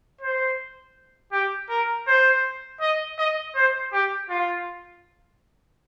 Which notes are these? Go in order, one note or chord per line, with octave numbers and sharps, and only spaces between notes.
C5
G4
A#4
C5
D#5
D#5
C5
G4
F4